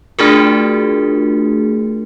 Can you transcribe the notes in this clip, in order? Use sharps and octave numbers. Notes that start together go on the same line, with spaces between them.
A3 D4 F4 F#4 G#4 A#4